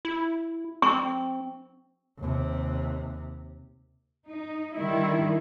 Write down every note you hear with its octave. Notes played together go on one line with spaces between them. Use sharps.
E4
C4 C#6
D#2 C3
D#4
D3 D#3 G3 E4